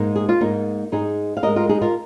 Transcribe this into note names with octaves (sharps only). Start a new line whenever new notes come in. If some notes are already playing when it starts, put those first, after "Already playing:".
Already playing: G#2 G#3 A#3 D#4
G#4
F4
G#2 G#3 A#3 D#4
G#2 G#3 D#4 G#4
F5
G#2 G#3 A#4 D#5
F4 A#4
D#4 G#4
F4 A#4